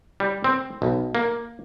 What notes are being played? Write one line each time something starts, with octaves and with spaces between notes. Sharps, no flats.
G3
C4
B1
A#3